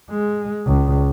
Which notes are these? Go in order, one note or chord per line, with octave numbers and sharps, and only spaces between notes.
G#3
C#2